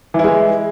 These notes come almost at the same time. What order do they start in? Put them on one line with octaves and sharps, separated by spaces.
E3 E4 G#3